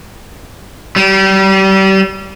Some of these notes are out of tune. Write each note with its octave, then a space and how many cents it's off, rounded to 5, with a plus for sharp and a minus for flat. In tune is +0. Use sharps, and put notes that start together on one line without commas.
G3 -30